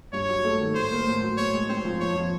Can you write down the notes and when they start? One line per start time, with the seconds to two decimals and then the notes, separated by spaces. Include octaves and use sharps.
0.13 G2 C#5
0.29 F#3
0.45 A3
0.60 D#3
0.75 A2 C5
0.91 A#3
1.07 A2
1.22 F#3
1.37 A2 C#5
1.54 G#3
1.69 C4 C5
1.85 F3
2.00 F2 C#5
2.16 F3